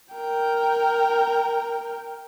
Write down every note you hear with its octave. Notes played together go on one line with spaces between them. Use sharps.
A#4 G5